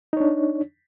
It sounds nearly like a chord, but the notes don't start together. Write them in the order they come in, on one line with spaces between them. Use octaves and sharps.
D#4 C#5 D4